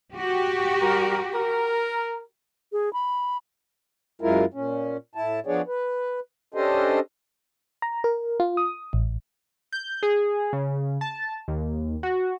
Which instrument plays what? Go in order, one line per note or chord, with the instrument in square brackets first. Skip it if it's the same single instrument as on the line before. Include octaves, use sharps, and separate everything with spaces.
[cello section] F#4 G4
[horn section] G3 A#4
A#4
[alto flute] G#4
B5
[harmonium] F#2 G#3 E4 F4 A#4
A#2 C#4
A2 E4 A5
F3 B3 D4 G#4 C#5 D5
B4
C#4 D4 G4 A4 C5 D#5
[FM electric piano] A#5
A#4
F4
D#6
A1
[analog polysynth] G6
G#4
C#3
A5
D#2
F#4